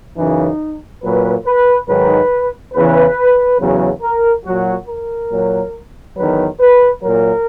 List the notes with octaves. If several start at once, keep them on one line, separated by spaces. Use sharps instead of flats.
F#2 C#3 E3 D#4
A#2 F#3 B4
B4
G#2 D#3 F#3 B4
E2 C#3 E3 B4
E2 C#3 F#3
A#4
A#2 F#3 F#4
A#4
A#2 F#3
E2 D#3 F#3 B4
B4
A#2 F#3 A#4